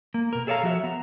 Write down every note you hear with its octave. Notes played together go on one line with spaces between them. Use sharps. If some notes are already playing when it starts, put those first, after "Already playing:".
A#3
B2 A#4
G#4 A4 C#5 D5 F5 A#5
F3 F#4 E5
B3 A#5